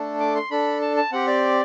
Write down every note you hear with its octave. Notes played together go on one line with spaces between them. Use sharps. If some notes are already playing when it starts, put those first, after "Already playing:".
Already playing: A3 D4 A4
D6
C6
D4 A4 B5
A5
A5
C4 G4 F#5
D5